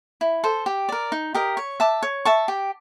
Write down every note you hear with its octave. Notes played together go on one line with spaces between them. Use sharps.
E4
A4 C5
G4
A#4 D5
D#4
G4 A#4 D#5
C#5
E5 A5 D6
C#5
E5 A5 C#6
G4